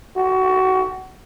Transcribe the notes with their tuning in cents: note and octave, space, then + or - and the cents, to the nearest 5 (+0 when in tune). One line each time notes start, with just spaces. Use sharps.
F#4 +20